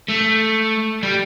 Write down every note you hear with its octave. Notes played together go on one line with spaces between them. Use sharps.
A3
G3